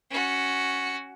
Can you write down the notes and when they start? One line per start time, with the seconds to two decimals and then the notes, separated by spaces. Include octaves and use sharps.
0.10 C#4 F#4